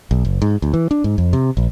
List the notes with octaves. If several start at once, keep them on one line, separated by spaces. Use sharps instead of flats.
B1
F#1
G#2
D2
E3
D4
G#2
F2
C3
A#1